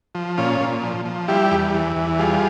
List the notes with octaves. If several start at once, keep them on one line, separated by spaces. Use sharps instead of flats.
F3
A#2 C#4 F4
A#2
F3
F3
G3 E4 G4
E2
E3
E2
G3 F4 G#4